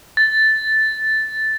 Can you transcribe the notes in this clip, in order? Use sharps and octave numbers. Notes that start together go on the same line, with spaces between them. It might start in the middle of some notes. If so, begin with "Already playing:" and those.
A6